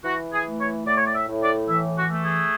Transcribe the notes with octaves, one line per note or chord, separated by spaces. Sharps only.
E3 F#4
G#4
A3
C#5
A2 D5
C#5
D5
E5
A2
D5
E3 E5
F#4
A3
G#4